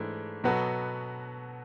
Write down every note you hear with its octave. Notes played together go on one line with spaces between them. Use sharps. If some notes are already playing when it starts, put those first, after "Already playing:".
Already playing: G#2 E3 A3 D4
B2 F#3 B3 F#4 A4